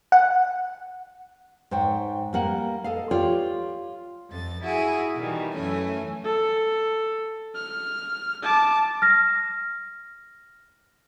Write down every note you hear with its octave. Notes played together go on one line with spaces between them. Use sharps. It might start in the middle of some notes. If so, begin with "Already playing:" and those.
F#5
G#2 C5 C#5 G5
G3 A#3 F#5
A4 D#5 F5
F4 G4 C#5 D5
F2 A6
E4 F#4 G#4
B2 D#3 E3 G3
F#2 E3 A3 C#4 G#5
A4
F6
A5 D6
F6 A#6